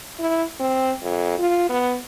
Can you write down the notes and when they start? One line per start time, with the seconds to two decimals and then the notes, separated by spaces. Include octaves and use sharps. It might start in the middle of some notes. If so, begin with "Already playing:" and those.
0.20 E4
0.60 C4
1.02 F2
1.38 F4
1.70 B3